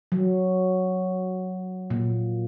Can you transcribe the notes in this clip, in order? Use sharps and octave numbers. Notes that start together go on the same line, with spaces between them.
F#3
A#2